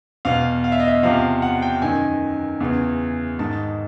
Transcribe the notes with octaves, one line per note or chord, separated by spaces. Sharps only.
E2 B2 F5
F5
E5
D#5
E5
E2 C3 F3 F5
F#5
G5
F#2 D#3 G#5
E2 C#3 E3
G#2 D#3 A5